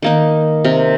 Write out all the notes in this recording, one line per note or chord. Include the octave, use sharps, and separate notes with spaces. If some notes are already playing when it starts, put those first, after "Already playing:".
D#3 A#3 D#4
C3 A#4